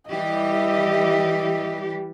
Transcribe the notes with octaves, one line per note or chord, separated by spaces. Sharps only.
E3 G3 G4 D#5 E5